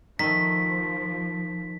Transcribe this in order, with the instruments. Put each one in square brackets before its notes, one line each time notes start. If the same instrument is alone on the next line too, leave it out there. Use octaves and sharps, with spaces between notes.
[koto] D#3 A3 [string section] F3 [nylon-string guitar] D#4 E5 [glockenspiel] B6